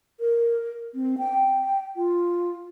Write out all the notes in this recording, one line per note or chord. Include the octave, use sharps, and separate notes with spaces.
A#4
C4
G5
F4